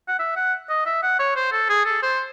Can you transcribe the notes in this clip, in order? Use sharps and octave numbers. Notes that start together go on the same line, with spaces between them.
F#5
E5
F#5
D#5
E5
F#5
C#5
C5
A4
G#4
A4
C5